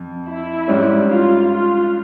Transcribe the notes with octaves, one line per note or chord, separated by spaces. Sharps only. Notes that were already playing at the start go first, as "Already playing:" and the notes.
Already playing: F2
E4
G#2 G3 C#4
F4
F4